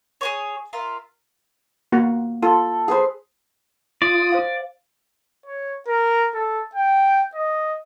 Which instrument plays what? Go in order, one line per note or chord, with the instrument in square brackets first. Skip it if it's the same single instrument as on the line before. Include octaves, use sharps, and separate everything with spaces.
[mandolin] G#4 B4 C#5
F4 A#4 E5
[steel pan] A#3 F#4
[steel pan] F4 [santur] A4
[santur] G#4 B4 C5
[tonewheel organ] F4 D#6 [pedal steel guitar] D5
[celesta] C5 F5
[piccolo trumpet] C#5
A#4
A4
G5
D#5